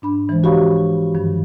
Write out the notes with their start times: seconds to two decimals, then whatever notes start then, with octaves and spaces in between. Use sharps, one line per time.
0.02 G#2 D4 B5
0.29 E3 F3 G#3 C5
0.44 F#4 G4 C#5 F5 B5 C#6
1.14 G2 D#3 F3